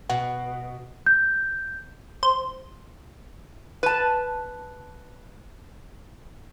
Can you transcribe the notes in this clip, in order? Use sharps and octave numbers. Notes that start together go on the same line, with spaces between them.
B2 F#5
G6
C5
B4 A5